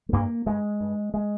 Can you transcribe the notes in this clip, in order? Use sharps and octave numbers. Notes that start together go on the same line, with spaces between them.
G#3
G2 A#3
G2 G#3
G2
G#3